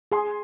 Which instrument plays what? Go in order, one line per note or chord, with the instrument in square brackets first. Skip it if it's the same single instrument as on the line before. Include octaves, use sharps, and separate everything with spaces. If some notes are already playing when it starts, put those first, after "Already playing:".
[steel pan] G#4 [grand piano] G#5 C6